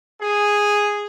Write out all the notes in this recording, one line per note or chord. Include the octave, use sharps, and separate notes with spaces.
G#4